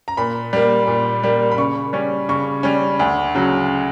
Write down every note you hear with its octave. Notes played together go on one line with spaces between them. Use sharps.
A#5
A#2 B5
G3 A#3
A#2
G3 A#3
B5
C#3 C#6
G3 C#4
C#3 C#6
G3 C#4
D2
C#3 F#3